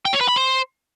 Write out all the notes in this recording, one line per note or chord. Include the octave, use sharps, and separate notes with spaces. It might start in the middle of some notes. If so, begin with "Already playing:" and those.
G5
C#5
B4
B5
C5